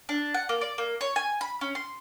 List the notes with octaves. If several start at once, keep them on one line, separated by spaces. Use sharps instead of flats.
D4
F#5
A#3
D5
A#3
C#5
G#5
B5
C#4
C6